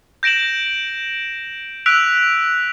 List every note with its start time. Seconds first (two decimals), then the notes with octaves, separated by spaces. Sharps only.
0.23 G6 A#6 D7 E7 F#7
1.86 E6 F#6 B6 D7 F7